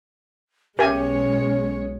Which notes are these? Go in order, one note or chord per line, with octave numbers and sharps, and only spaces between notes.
B1 G#3 C#4 G4 A#4 C#5 E5 G#5